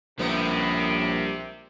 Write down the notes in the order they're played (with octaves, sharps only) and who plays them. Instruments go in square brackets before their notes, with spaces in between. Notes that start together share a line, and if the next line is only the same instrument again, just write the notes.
[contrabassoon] A#1 [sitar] A2 B3 [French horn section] C3 [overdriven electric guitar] G3 A#4